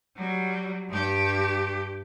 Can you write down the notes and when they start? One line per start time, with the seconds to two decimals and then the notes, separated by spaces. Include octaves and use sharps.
0.16 F#3 G3
0.89 G2 G4